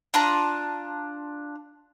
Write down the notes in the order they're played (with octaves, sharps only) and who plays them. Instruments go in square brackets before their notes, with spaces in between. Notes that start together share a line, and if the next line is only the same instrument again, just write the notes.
[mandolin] D4 F4 A5 A#5